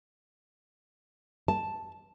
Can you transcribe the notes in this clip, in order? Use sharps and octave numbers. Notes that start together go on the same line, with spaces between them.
A5